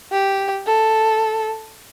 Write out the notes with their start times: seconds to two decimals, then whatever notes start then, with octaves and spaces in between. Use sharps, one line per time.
0.12 G4
0.67 A4